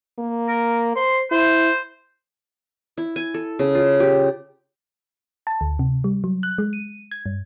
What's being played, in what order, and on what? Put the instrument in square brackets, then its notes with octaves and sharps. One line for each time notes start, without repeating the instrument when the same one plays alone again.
[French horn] A#3
[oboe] A#4
[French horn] C5 [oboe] C6
[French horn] E4 [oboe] C5
[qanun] E4
G#5
A4
C#3
F4
G4
[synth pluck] A5
D2
C3
G3
F#3
F#6
G#3
D#7
G#6
G2